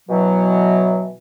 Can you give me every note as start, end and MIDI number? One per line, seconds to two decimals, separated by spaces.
0.09 1.12 47
0.09 1.12 52
0.09 1.12 54